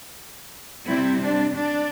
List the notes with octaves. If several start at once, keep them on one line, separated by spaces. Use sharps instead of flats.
C3 G3 C4 E4
D4
D4